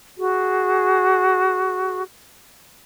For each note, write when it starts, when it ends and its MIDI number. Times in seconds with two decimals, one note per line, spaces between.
0.18 2.01 66
0.18 2.01 68